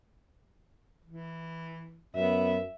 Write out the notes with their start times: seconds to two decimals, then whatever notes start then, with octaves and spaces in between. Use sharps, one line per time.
1.06 E3
2.16 F#2 B3 E5